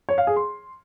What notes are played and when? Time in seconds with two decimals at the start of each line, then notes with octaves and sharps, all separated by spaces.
0.09 C#5
0.18 F5
0.27 G#4
0.36 C6